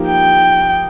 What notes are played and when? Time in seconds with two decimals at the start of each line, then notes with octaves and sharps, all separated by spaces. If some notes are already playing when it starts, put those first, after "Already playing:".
Already playing: F3 A#3 D#4 G4
0.08 G5